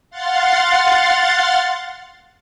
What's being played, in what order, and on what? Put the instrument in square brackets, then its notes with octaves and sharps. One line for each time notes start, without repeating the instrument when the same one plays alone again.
[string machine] F5 F#5 C6 A6